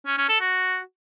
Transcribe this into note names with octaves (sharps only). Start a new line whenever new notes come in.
C#4
C#4
A4
F#4